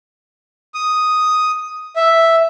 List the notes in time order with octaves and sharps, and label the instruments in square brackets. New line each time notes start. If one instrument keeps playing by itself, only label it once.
[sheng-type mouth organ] D#6
E5